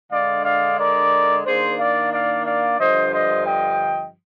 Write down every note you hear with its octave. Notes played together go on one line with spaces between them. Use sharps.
D3 G#3 D4 D5 F5
D5 F5
A#4 D5
D#3 A#3 D4 G#4 C5
D5 F5
D5 F5
D5 F5
G2 D3 F3 C5 D#5
C5 D#5
D#5 G5